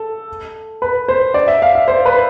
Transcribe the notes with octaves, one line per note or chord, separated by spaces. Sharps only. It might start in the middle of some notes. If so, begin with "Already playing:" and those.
Already playing: A4
B4
C5
D5
E5
F5
E5
C5
B4